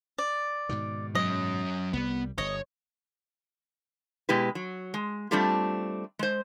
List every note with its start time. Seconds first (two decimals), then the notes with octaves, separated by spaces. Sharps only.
0.18 D5
0.69 G#2 B2 D#3
1.15 F#3 C#4 D#5
1.93 C2 G3 B3
2.38 G1 C#5 D#5
4.29 B2 G#3 E4 G4 B4
4.55 F#3
4.94 G#3
5.31 G3 A3 C4 D4 F4 G4
6.19 G#3 C5